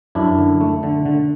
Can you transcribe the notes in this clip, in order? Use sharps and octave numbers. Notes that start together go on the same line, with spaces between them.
F#2 D4 E4
D3
A3
D3
D3